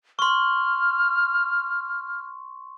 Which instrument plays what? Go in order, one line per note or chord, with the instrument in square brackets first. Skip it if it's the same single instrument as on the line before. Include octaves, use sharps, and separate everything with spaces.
[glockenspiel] C6 C#6 [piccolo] F6